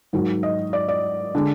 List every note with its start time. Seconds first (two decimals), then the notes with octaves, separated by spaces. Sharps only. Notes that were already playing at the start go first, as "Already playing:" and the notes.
0.13 G#2 D#3 F#3
0.43 D#5
0.73 D5
0.89 D5
1.35 D3 G#3 D4